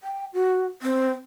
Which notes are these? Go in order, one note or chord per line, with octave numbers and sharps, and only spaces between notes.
G5
F#4
C4